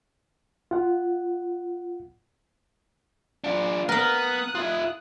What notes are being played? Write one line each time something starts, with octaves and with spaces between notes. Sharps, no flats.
F4 F#5
D4 F4
B3 A#4 F5 D#6 F#6
F4 E5